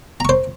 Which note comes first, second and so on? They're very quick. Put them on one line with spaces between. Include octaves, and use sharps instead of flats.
A#5 C#6 C5